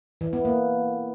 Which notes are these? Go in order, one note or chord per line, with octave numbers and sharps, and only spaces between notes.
E3
B3
A#3